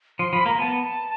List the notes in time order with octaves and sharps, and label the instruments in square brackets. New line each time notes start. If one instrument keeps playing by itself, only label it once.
[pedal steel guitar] F3 [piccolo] C6
[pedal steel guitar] F3 [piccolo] B5
[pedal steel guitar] A#3 [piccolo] A#5
[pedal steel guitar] B3 [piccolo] A5